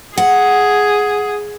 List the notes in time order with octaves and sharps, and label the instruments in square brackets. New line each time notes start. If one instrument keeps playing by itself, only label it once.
[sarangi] G#4 [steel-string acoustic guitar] F#5